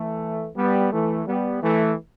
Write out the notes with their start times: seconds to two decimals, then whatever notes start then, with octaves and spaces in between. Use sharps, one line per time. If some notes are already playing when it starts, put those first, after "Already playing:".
Already playing: E3 A3
0.56 G3 B3
0.92 E3 A3
1.27 G3 B3
1.63 E3 A3